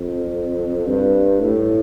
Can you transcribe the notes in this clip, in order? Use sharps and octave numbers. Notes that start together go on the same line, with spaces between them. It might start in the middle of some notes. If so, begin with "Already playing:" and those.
Already playing: F2
G2
A2